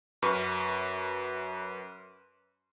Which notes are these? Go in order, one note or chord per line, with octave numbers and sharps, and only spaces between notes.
F#2 B4 C#6